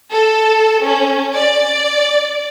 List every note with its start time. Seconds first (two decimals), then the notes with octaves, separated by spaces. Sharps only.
0.12 A4
0.85 C#4
1.35 D5